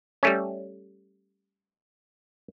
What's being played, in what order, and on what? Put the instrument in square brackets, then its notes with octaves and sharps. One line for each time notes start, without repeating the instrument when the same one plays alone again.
[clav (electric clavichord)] G3 A3 C#4